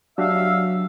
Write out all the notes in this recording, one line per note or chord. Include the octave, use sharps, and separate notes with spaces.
F#3 D4 F#4 G4 E5 F5 E6